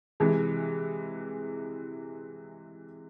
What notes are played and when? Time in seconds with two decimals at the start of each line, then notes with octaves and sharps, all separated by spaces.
0.20 C3 E3 G#3